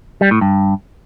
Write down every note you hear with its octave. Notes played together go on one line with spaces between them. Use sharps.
G3
A2
G2